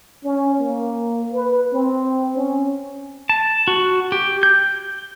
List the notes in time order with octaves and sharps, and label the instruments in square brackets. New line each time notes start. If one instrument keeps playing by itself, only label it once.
[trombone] C#4
A#3
B4
C4
C#4
[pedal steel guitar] A5
F#4
G4
G6